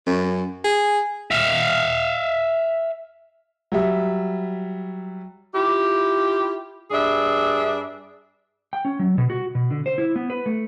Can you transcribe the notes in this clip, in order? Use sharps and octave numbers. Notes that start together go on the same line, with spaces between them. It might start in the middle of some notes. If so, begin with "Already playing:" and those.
F#2
G#4
E5 F5
F#3 G3 E5
E4 F4 G4
G2 D4 G#4 E5
G5
C#4
F#3
B2
F#4
B2
D3
C5
E4
B3
B4
A3